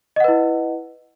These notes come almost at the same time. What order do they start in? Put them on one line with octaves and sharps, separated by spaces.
D#5 F#5 B4 E4